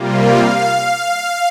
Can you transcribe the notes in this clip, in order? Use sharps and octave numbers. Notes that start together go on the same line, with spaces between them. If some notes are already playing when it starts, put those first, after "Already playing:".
Already playing: C3 G3 A#3 F4
F5